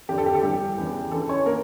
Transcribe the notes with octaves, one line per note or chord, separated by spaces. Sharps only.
F2 D3 G4
A4
G4
A4
G2 E3 G4
E2 C#3 E3
D2 C#3 E3 A4
C#4 C#5
A#3 A#4